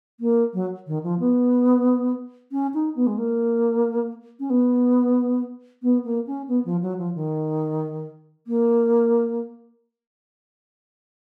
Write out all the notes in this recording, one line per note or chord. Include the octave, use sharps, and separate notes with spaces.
A#3
F#3
D#3
F3
B3
C#4
D#4
B3
G#3
A#3
C#4
B3
B3
A#3
C#4
B3
F3
F#3
F3
D#3
A#3